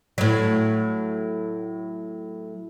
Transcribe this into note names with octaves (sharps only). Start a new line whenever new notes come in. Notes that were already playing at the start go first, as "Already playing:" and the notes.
A2 F#3